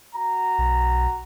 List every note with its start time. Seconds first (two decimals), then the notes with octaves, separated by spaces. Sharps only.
0.15 F#4 A#5
0.58 B1